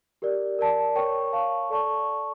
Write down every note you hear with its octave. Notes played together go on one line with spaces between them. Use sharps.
G4 A#4 D5
A#4 D5 A5
A#4 C#5 G5 C#6
C#5 F5 A5 C#6
A4 D5 A5 C#6